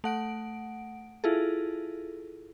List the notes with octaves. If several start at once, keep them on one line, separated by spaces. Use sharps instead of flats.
A3 F#5 D7
E4 F4 G#4 A4